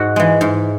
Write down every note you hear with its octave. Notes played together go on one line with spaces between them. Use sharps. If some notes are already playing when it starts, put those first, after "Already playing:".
Already playing: G#2 F#4
E3 G#3
G#2